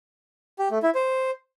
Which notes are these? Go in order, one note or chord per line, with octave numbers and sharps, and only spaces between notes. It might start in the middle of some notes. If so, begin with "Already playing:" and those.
G4
A3
E4
C5